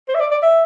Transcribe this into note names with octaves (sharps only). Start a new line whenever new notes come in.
C5
E5
D5
D5
E5